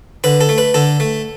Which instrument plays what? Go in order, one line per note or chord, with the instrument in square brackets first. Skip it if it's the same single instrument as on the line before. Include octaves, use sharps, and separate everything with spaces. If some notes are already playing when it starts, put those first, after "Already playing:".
[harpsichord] D3 B4
A4
A3
B4
D3 A4
A3